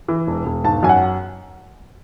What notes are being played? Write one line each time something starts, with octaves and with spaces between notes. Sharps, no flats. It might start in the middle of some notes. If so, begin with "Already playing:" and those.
E3
E1
E1
G#1 A5
F#2 G#5
F#5